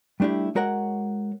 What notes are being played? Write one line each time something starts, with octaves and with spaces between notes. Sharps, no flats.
G3 A3 D4 E4 G4
G#3 F#4 A#4 C#5 F#5